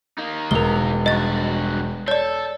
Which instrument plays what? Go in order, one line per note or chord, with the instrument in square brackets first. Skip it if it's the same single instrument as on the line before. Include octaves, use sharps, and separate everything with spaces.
[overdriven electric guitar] A#3 D#4
[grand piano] E1 [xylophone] A#4 G7
[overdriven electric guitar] G2 F#4 [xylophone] D#5 A6
[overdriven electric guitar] A4 [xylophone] C#5 D5